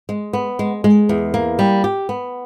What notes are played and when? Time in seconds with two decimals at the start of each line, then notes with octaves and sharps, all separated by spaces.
0.09 G#3
0.33 B3
0.59 G#3
0.84 G#3
1.09 E2
1.34 A#3
1.59 G3
1.84 G4
2.09 B3